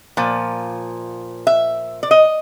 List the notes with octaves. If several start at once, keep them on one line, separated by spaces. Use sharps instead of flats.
A#2 F3
E5
D5
D#5